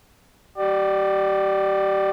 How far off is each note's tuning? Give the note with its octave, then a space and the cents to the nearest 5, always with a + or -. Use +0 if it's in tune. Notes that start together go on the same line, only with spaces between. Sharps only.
G4 -35 D5 +20